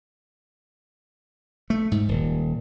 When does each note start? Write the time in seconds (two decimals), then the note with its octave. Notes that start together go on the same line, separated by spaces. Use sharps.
1.70 A3
1.92 G#2
2.08 D#1